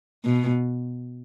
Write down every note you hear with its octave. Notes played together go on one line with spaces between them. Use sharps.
B2